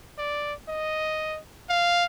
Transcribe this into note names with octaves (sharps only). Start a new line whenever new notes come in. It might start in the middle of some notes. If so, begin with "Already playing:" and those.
D5
D#5
F5